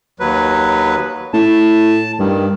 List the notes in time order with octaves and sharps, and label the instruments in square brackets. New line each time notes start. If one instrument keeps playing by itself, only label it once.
[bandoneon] D#2 F#3 B4
[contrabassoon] A2 [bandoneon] A5
[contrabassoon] G2 [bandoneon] D#3